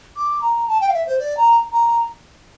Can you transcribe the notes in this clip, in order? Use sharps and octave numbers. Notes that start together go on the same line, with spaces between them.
D6
A#5
A5
G5
F5
E5
C5
D5
A#5
A#5